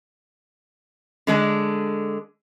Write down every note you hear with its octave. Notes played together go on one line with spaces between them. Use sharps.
D3 G#3 D4